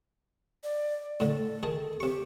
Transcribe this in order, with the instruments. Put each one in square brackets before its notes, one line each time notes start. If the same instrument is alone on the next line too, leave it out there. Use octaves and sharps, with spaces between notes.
[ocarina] D5
[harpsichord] A2 D3 [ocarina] A4
[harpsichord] D#3 G#4 A5
[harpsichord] C3 C#6 [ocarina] G4